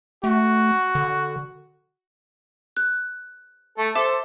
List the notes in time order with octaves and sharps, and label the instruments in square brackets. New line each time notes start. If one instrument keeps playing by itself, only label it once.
[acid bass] A3 [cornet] F#4
[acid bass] D3
[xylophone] F#6
[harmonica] A3 A4
[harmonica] A4 C5 [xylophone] E5 D6 E7